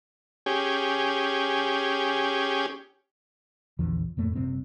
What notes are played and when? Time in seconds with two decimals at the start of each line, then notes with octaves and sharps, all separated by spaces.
0.46 C#4 G4 G#4
3.79 A#1 E2 D3 F3
4.17 F2 A2 A3 A#3
4.35 F#1 C3 G3 C4